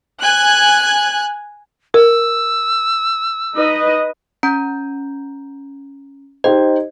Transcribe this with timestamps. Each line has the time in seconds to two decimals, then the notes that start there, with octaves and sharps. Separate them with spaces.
0.23 G#5 F#6
1.94 A#4 E6
3.55 D#4 B4 D#5
4.43 C#4 A#5 G6
6.44 D#4 G4 C5 D#5